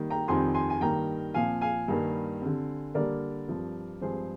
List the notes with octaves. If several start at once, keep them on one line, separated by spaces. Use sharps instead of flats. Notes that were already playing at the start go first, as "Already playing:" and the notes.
Already playing: D#3 G3 A#3
G5 A#5
F2 D#3 G3 C4 G#5 C6
G#5 C6
G#5
G2 D#3 A#3 G5 A#5
A#2 F3 C4 F5 G#5
F5 G#5
G2 D#3 G3 A#3
D3 G3 C4
D3 G3 A#3 A#4 D5
G2 F3 C4
G2 F3 G#3 C4 G#4 C5